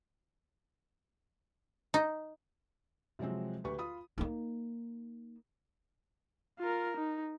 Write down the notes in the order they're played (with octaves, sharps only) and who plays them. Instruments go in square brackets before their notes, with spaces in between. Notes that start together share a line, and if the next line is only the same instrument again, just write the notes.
[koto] D#4
[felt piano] C3 F3 F#3 G#3 C4
D2 G4 B4 C#6
F4 B5 D#6
[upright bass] A#3 D#4
[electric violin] F4 A#4
D#4